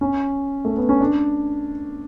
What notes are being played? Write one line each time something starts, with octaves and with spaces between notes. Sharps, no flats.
C#4
A3
B3
C#4
D4